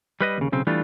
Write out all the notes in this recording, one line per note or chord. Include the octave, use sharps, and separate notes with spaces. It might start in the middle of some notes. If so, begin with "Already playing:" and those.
G3 B4 D#5
D#2 C#3
B1 C#3 C4
E3 G3 A3 D4 F4